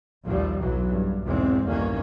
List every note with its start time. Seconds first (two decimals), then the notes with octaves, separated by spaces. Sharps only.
0.24 A#1 D#2 F3 G3
0.60 B1 E3 F#3
0.89 G2
1.24 B1 E2 G#2 G#3 C4
1.66 B1 E2 G2 D#3 A#3 C#4